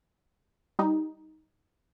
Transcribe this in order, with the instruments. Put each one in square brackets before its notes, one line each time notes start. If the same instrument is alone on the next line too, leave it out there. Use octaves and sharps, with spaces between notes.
[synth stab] G3 D#4